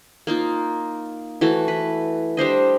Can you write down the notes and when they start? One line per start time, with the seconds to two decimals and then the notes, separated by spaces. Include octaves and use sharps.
0.27 A#3 D#4 F4
1.41 E3 A3 F#4
1.68 B4
2.37 G3 D4 C5 D#5